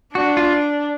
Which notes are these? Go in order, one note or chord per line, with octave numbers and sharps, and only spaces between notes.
D4 F#4
F4